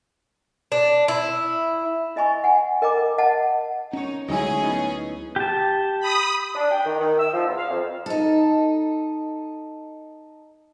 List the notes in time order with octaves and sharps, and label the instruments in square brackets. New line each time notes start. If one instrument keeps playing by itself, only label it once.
[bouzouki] D4
E4
[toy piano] E4 D#5 G#5 B5 C#6
F#5 G#5
A#4 D#5 G5 A#5 D6
D#5 F#5 A5
[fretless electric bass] C#4 [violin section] D#4 [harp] C#5 E7
[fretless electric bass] D2 F#3 G#3 [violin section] C#4 G#4 [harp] D#4 E4
[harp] B3 D#4
[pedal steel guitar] G4 A5
[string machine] B5 D#6
[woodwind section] D4
G5
D#3
D#3
E6
F3
E2
F5
F2
[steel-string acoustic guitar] D#4 A4